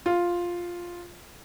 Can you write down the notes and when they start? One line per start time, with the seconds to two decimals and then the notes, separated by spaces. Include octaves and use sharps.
0.06 F4